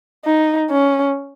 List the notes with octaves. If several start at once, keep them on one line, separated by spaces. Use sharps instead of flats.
D#4
C#4